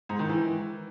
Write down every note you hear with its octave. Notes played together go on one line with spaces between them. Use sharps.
G#2
D#3
E3